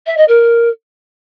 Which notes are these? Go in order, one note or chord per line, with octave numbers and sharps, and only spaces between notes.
E5
D#5
A#4